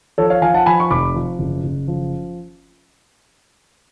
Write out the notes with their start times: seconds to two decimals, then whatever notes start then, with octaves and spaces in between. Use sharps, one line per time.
0.18 F3 A4 C#5
0.30 C#5 F5
0.42 F3 F5 G#5
0.54 F#5 A5
0.66 F3 G#5 B5
0.80 C#6
0.90 F1 B5 D6
1.15 F3
1.39 F#1
1.64 F#1
1.88 F3